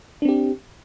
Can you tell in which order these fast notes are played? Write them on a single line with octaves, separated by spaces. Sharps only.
D4 C4 G4